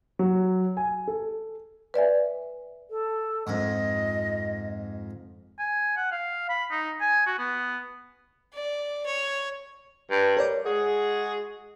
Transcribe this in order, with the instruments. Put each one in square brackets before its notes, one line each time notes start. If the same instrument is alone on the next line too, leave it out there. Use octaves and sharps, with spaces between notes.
[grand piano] F#3
G#5
A4
[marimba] B4 D5 E5 G#5
[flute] A4
[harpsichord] F2 G#2 [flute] D#5
[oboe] G#5
F#5
F5
B5
D#4
G#5
F#4
B3
[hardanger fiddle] D5
C#5
[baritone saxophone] G2
[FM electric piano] A#4 C#5 D5
[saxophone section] G#3 F#4 G#4